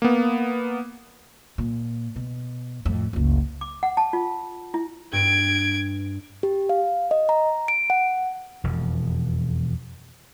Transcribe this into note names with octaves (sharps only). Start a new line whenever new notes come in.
A#3 B3
A#2
B2
F2 A2
F#1 C#2
D6
F#5
A5
F4
E4
G2 G#6 D7
G4
F5
D#5
A#5
D7
F#5
E1 F2